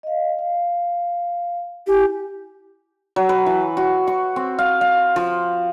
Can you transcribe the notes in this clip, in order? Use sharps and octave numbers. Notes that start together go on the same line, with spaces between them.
D#5 F5
F5
E4 G4 G#5
F#3
B4
E3
F#4
C#6
C4
F5
F5
F3